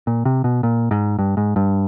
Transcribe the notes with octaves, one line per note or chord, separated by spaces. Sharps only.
A#2
C3
B2
A#2
G#2
G2
G#2
G2